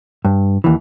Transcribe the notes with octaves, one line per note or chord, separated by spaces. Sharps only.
G2
D#2 E3